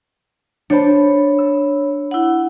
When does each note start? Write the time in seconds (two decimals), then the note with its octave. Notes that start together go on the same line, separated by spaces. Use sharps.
0.70 D4 C5 C#5 A5 B5
1.38 E6
2.11 E4 F#5